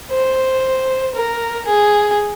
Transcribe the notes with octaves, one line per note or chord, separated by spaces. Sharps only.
C5
A#4
G#4